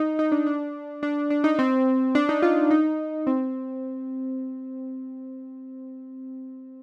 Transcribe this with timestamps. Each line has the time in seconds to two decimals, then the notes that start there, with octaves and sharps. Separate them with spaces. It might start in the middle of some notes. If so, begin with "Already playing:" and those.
Already playing: D#4
0.19 D#4
0.32 D4
0.46 D4
1.03 D4
1.30 D4
1.44 D#4
1.59 C4
2.15 D4
2.29 D#4
2.42 F4
2.71 D#4
3.27 C4